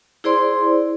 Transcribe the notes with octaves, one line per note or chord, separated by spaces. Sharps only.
E4 G#4 C5 D5 C6